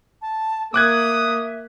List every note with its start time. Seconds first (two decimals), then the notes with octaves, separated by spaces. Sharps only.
0.22 A5
0.74 A#3 E5 D6 D#6 F#6 G#6